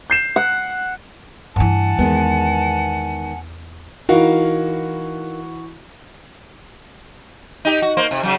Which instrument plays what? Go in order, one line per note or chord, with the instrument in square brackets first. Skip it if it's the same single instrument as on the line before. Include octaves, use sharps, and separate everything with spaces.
[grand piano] G6 C7 E7
[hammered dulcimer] F#5
[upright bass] G2 E3 [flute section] F#5 G#5 A5
[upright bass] E2 [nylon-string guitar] D#3 G#3 B3
[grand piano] E3 F#4 [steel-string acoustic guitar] D#4 A#4 F5
[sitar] D#4 G4
F#4
A#3 C5
C3
C#3 F#3